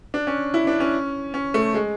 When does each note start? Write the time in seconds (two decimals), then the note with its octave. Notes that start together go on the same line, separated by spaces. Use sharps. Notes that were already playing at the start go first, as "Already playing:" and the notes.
0.14 D4
0.27 C#4
0.54 E4
0.67 D4
0.80 C#4
1.34 C#4
1.54 A3
1.74 G#3